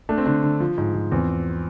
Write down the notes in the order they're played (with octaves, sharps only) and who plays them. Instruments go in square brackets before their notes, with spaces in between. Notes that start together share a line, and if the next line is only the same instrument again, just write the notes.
[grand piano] A3 D4
C4
D3 D4
D3
F3
G#2
F3
E2 C4